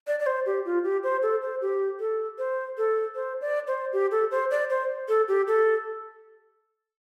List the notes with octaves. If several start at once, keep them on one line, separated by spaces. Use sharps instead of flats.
D5
D5
C5
G4
F4
G4
C5
A4
C5
G4
A4
C5
A4
C5
D5
C5
G4
A4
C5
D5
C5
A4
G4
A4